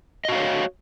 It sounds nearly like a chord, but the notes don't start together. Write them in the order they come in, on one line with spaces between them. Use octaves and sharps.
D#5 F#4 F5 C#5